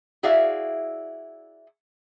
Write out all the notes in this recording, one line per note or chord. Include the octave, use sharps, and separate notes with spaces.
E4 F#4 G#4 D5 E5 F5